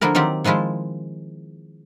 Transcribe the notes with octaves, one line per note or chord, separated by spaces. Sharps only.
D3 F3 A#3 E4 A#4
D#3 F#3 C4 F4 G4
D#3 F3 G#3 E4 F4